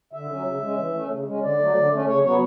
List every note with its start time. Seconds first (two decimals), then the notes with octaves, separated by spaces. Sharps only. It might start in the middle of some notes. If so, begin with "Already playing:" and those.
0.13 D3 E5
0.29 F#3 C#4
0.46 C#3
0.61 G#3 C#4
0.78 E3
0.94 A3 C#4
1.11 C#3
1.27 G#3 C#4
1.42 D3 D5
1.58 F#3 A3
1.76 D3
1.91 A3 C#4
2.07 C#3 C#5
2.24 F#3 B3 C#5